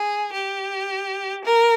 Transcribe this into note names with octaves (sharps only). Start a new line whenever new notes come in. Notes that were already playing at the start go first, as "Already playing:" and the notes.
Already playing: G#4
G4
A#4